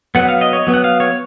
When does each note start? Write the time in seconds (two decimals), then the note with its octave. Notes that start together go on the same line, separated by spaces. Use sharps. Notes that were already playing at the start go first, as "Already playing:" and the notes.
0.15 F#3 B3 F#5
0.29 F5
0.41 D#5
0.53 C#5
0.67 F#3 B3
0.74 F#5
0.84 F5
1.00 C#5